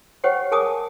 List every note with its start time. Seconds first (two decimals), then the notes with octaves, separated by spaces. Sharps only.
0.24 G4 C5 C#5 F#5 G5
0.52 G#4 A#4 G#5 A5 D6 D#6